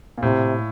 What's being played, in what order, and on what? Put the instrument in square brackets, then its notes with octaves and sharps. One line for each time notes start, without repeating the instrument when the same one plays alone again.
[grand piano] A#2
[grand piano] A2 [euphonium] C3